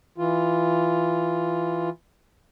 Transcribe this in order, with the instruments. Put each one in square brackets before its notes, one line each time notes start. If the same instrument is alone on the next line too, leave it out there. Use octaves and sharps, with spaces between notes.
[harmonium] E3 F4